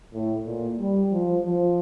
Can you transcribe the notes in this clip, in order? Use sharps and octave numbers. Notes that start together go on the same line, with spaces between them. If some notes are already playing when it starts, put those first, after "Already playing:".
A2
A#2
G3
F3
F3